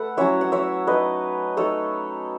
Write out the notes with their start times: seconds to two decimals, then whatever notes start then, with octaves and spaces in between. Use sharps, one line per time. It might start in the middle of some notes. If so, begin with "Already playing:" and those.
Already playing: A3 A4 B4 F#5
0.17 F#3 C#4 E4 C#5 E5
0.41 F#5
0.52 C#5 E5
0.87 A3 D#4 B4 D#5
1.57 A3 D#4 A4 C#5